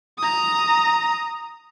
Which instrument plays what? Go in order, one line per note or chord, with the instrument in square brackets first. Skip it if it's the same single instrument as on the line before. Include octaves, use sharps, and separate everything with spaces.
[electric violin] A#5 D#6